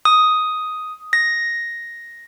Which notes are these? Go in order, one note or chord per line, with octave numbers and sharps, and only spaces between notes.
D#6
A#6